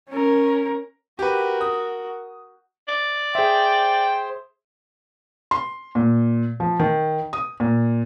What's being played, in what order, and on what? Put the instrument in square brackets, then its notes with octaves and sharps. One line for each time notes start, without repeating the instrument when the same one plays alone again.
[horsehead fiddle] C#4 A#4
[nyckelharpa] F#4 A#4 [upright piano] G4 B4
[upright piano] D#6
[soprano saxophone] D5
[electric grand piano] G#4 E5 [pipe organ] C5 [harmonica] G5
[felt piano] C6
A#2
F3
D#3
D#6
A#2